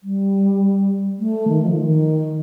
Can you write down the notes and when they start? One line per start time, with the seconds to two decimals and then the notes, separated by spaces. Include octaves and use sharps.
0.03 G3
1.19 A3
1.48 D#3
1.62 F3
1.77 D#3